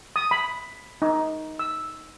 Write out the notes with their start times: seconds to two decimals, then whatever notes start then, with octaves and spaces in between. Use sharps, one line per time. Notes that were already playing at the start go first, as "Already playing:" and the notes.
0.16 D#6
0.31 B5
1.02 D#4
1.59 E6